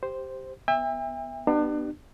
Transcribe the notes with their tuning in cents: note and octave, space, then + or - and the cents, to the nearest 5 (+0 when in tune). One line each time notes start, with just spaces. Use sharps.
G4 +0 C5 +0
B3 +0 E5 +0 G5 +45
B3 +0 D4 +35 G4 -25